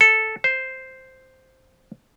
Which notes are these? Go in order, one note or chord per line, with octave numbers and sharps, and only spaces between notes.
A4
C5